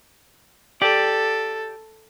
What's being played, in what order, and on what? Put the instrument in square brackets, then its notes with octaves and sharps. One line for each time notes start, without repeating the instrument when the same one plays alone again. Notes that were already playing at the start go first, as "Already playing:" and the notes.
[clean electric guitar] G4 D5 [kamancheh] A4